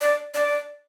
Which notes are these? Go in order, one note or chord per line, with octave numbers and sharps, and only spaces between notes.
D5
D5